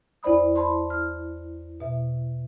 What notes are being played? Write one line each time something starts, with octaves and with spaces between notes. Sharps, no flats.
E2 E4 C5 D5 B5 D#6
C5 A5 B5 C6
F6
B2 E5